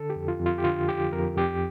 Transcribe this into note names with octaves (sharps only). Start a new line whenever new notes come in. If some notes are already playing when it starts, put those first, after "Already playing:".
Already playing: D3 A4
G4
F2
F4
F2
F4
G4
D3 F4
F3 G4
F2 A#4
F2 G4